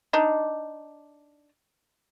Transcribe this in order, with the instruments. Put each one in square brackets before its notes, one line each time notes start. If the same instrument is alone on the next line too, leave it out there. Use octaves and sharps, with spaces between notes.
[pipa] D4 D#4